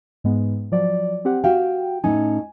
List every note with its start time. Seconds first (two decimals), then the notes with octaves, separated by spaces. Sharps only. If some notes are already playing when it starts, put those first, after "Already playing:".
0.24 G#2 G#3 B3
0.72 F3 F#3 D5
1.25 C4 G4 F#5
1.44 F#4 G4 F5 G5
2.04 A2 C#4 D#4 G#5